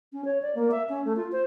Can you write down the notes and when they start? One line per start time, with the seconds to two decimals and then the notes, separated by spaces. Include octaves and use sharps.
0.13 C#4
0.25 C#5
0.42 D5
0.55 A#3
0.71 E5
0.89 C#4
1.05 A3
1.16 F4
1.32 C5